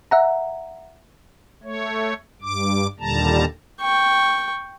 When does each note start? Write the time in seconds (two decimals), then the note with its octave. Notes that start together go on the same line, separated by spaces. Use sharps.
0.11 E5 F#5 A#5
1.64 A3 C#5
2.42 G2 D6
3.00 D#2 A#2 D3 G3 A5 A#5
3.81 G5 C#6